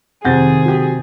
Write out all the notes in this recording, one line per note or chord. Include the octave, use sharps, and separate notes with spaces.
F2 C3 D#3 C4 G#4 F#5 G6 A6
F#3 G4